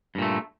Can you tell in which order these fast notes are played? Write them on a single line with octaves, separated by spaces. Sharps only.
G2 A#2 A3